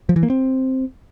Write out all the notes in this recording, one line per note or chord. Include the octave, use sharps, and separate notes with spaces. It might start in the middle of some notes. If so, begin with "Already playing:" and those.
F3
E3
A#3
C4